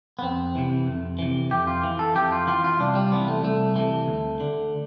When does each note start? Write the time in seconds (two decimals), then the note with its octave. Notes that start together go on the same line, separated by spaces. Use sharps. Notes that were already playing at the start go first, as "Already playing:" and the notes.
0.19 B3
0.22 F2 C4
0.55 C3 E3
0.87 F2
1.19 C3 E3
1.51 F2 G4
1.67 F4
1.84 E3
1.99 A4
2.15 F2 G4
2.32 F4
2.47 E3 F4
2.64 F4
2.79 C2 D4
2.95 G3
3.12 C3 E3 B3
3.28 A3
3.43 C2 A3
3.76 C3 E3 A3
4.08 D2
4.40 D3